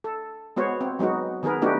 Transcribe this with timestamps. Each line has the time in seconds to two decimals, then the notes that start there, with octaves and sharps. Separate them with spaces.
0.04 A4
0.56 G#3 B3 F#4 C5 C#5
0.81 C4
0.99 F#3 G#3 B3 D#4 F#4
1.43 D#3 B3 G#4 A#4 B4
1.62 A3 B3 D4 D#4 F#4 G4